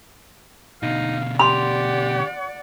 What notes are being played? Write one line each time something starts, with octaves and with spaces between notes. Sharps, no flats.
B2 D3 D#4 F5
G4 D5 F#5 B5 C6